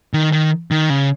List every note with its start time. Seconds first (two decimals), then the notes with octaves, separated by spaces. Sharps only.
0.14 D#3
0.32 D#3
0.71 D#3
0.90 C#3